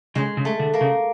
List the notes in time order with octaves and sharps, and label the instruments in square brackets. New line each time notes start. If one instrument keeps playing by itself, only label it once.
[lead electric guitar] C#3 [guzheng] G#3
[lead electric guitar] C#3
[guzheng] A3
[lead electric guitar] D3
[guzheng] A#3
[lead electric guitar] C#3